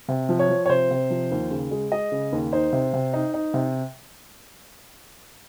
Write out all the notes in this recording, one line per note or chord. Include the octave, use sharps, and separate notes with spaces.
C3
F3
C#5
F3
C#5
C3 C5
C3
F3
D#2
C#3
G#3
G#3 D#5
C#3
D#2
D#4 C5
C3
C3
D#4
D#4
C3